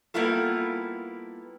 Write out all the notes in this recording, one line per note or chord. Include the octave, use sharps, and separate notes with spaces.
G3 A#3 B3 E4 F4 A4